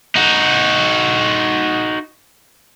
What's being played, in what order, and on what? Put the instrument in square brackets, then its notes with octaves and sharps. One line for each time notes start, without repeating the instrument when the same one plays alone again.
[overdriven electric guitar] D#4 F#4